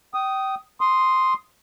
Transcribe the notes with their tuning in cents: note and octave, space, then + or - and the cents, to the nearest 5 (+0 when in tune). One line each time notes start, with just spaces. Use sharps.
G5 -25 D#6 +0
C6 +0 D#6 +0